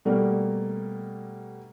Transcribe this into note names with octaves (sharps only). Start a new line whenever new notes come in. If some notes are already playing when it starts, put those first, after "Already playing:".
B2 G3 A3 A#3 A#4